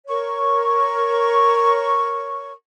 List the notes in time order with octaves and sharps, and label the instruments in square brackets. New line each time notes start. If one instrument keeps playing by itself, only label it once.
[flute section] A#4 C#5 C#6